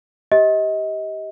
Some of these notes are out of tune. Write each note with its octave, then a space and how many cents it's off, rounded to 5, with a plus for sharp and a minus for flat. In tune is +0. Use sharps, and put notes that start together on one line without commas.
G4 -5 D#5 +30